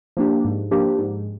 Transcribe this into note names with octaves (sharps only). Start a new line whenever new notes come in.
F3 A#3 D4 G4
G#2
F3 A#3 D4 G4
G#2